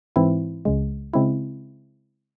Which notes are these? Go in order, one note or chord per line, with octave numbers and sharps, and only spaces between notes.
G#2 E3 C4 E4
C#2 C#3 G#3
C#3 G#3 C4 E4